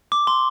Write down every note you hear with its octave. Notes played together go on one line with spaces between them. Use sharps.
D6
C6